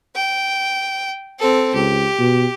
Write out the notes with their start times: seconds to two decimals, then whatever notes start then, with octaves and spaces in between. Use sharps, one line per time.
0.15 G5
1.39 C4 A4
1.74 C#2 G4
2.19 B2